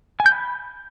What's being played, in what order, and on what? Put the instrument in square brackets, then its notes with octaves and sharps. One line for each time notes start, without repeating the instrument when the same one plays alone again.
[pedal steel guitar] G#5
G6
B5